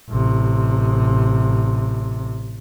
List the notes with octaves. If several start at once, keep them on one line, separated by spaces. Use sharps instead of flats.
A1 C3